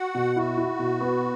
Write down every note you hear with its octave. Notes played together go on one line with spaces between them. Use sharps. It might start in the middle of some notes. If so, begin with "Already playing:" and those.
Already playing: F#4 F#5
B2
E4 F#4
E4
B2
B3